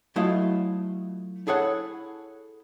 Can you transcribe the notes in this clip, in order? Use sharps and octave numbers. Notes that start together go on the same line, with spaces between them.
F#3 A3 E4 F4 D#5 F5
E4 G#4 A4 C#5 F#5